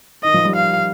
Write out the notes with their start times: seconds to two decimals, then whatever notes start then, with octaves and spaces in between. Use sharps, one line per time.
0.24 D#3 D#5
0.34 F3
0.45 G3
0.55 F5